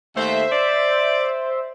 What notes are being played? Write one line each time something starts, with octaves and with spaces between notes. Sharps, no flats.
D#2 A3 C5 E5
D5